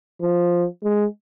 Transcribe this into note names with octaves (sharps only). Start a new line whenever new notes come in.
F3
G#3